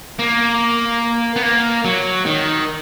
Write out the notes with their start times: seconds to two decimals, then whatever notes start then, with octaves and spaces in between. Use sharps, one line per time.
0.19 A#3
1.36 B3
1.43 A#3
1.85 F#3
2.26 D#3